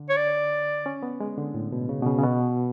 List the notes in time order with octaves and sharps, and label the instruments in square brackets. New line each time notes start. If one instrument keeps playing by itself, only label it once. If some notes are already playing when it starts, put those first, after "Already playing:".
Already playing: [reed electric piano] D3
[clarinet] C#5
D5
[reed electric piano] C#4
B3
G#3
D3
A2
B2
C#3
B2
C#3
C#3
B2